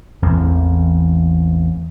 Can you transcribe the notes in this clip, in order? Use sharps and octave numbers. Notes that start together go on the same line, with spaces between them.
A1 E2 E3 C4